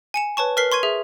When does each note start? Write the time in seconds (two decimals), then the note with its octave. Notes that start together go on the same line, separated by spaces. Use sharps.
0.14 G#5 C#7 E7
0.37 B4 C#5 A5 C#6
0.57 A#4 B4 F6 B6 C7 G7
0.72 C6 C#6 G#6 D#7
0.83 G#4 E5